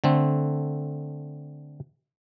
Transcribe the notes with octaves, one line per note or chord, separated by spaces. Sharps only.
D3 A3 C4